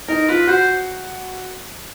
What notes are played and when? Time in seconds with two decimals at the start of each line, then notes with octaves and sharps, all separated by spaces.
0.08 D#4 A#4
0.28 F4 B4
0.47 F#4 C5